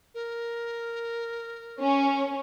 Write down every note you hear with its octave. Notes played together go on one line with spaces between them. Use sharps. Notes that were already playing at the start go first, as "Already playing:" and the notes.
A#4
C#4